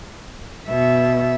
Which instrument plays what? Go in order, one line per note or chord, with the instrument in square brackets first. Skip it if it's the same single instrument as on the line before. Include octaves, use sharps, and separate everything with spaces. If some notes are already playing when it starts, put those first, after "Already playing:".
[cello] B2 E5